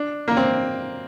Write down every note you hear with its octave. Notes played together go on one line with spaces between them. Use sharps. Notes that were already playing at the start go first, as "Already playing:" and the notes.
Already playing: D4
A#3
C4